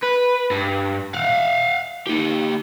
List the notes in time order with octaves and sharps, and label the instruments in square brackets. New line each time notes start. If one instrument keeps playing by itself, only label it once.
[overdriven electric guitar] B4
G2
F5 F#5
D#4 G4